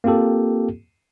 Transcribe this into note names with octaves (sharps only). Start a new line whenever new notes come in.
A#3 C4 F4 G4 A4